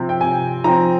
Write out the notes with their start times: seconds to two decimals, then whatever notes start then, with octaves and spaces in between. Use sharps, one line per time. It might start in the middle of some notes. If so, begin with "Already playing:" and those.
Already playing: C3 F3 C4
0.09 G5
0.21 C3 G#5
0.64 F3 C4 A#5